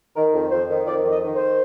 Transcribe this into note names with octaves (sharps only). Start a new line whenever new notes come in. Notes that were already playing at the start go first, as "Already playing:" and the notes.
D#3 A#4
F2
F2 C5
D#3
F2 D5
D#3
D#5
D#3
C5